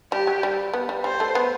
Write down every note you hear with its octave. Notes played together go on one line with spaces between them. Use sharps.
G3 G4
F#3
G3
B3
G3
G3 C5
A3
B3